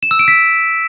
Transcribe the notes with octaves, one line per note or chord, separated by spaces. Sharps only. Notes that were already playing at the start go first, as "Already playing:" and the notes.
E7
E6
D7
B6